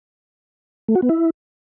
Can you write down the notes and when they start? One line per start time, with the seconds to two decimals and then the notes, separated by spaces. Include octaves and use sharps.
0.88 A3
0.95 F#4
1.02 B3
1.09 E4